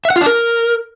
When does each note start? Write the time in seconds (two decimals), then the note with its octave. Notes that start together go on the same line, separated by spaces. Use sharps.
0.05 E5
0.10 F#5
0.16 F4
0.21 D4
0.27 A#4